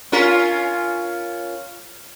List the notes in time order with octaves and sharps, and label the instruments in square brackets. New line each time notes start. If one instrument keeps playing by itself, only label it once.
[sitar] C#4 F4 A#4